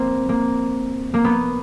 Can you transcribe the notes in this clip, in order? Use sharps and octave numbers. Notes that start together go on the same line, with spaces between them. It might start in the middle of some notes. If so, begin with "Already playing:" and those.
Already playing: A#3 C4
A#3
A#3
B3